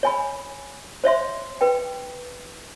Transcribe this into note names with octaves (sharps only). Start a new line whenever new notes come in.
C#5 G#5 B5
C5 C#5 E5 C6
B4 G5